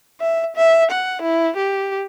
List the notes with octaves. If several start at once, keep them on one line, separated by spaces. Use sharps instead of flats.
E5
E5
F#5
E4
G4